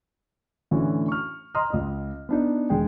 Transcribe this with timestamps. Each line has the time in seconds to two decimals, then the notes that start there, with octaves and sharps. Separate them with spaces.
0.71 A2 D3 E3 A3 C#4 F#4
1.08 C#6 F6
1.54 D#5 A#5 C6 D#6 F6
1.70 C#2 D#5
2.29 B3 D4 D#4
2.70 E1 G#3 G5